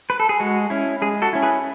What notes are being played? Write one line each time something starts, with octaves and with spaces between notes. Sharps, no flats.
B4
A4
G#4
G#3 F#4
C#4 E4
G#3 G#4
F#4 A4
C#4 E4
G#4 B4